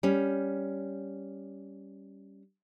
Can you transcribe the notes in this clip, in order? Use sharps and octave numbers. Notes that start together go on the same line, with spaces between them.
G3 C#4